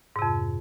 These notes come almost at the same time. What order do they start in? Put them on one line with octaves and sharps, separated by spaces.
G#2 C3 F2